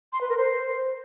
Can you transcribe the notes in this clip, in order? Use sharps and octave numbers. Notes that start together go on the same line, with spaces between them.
C6
B4
A#4
C5